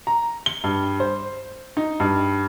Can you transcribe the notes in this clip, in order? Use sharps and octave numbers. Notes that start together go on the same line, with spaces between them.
A#5
G7
G2
C5
D#4
G2